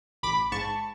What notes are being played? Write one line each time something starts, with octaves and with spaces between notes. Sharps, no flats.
A1 B5 D6
G#2 A5 C#6